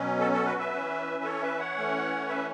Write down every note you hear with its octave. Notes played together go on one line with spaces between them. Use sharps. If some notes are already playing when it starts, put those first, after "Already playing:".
Already playing: B2 F#3 C#4
A4
A4
F#4 B4
B4 E5
E3 C#4
A4 C#5
B4 E5
C#5 F#5
E3 A3 C#4
B4 E5